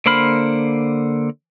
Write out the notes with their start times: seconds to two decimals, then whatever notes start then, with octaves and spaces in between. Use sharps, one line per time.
0.06 D3 A#3 C5 B5 F6